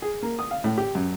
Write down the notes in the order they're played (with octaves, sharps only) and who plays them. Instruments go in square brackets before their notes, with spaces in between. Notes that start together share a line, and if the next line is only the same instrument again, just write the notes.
[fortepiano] G#4
A#3
D#6
F5
A2
G4
F#2